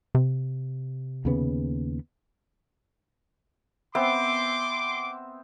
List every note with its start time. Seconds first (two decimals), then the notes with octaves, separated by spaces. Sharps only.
0.15 C3
1.25 D#2 C#3 B3
3.95 B3 C4 E5 C6 D6